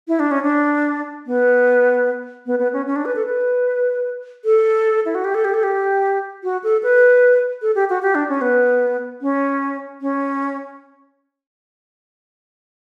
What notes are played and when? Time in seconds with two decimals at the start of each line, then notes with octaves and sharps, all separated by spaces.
0.08 E4
0.20 D4
0.31 C#4
0.43 D4
1.27 B3
2.46 B3
2.59 B3
2.73 C#4
2.86 C#4
2.96 D4
3.05 B4
3.16 A4
3.26 B4
4.45 A4
5.06 E4
5.15 F#4
5.25 G4
5.35 A4
5.45 G4
5.54 A4
5.63 G4
6.44 F#4
6.64 A4
6.83 B4
7.62 A4
7.75 G4
7.90 F#4
8.02 G4
8.15 D4
8.29 C#4
8.41 B3
9.22 C#4
10.01 C#4